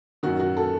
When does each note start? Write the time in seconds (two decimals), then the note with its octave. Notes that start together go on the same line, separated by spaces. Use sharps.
0.23 F#2 D#3 F#4
0.39 F#4
0.57 A4